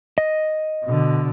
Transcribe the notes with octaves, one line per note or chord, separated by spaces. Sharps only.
D#5
B2 D3